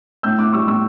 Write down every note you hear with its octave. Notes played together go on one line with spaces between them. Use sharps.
A2 E6 G6
A2 D6 F#6
G3 C#6 E6
A2 C#6 E6